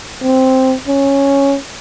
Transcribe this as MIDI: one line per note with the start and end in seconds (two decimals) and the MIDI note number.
0.22 0.75 60
0.87 1.56 61